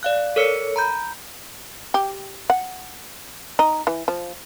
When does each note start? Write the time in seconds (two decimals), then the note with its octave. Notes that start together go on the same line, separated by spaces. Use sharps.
0.03 D5 F5 F#6
0.36 A4 A#4 C#5 E6 C#7
0.76 A#5 B5 G6
1.94 G4
2.50 F#5
3.59 D#4
3.87 E3
4.08 F3